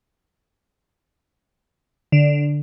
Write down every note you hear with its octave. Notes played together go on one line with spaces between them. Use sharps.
D3